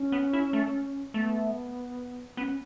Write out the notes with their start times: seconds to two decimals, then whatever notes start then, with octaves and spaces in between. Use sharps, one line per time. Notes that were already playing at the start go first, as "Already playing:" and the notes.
Already playing: C#4
0.12 B3
0.33 E4
0.53 A3
1.14 A3 B3
2.37 B3 C#4